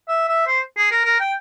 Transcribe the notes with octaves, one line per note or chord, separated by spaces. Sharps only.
E5
E5
C5
G#4
A#4
A#4
G5